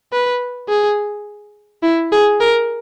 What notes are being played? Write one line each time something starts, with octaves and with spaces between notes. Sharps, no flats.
B4
G#4
E4
G#4
A#4